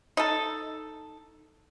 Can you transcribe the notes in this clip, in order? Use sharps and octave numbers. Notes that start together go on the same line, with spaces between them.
D#4 A4